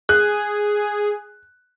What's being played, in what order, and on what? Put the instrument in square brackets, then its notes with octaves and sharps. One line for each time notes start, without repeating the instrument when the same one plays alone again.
[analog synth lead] G#4 [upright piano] F#6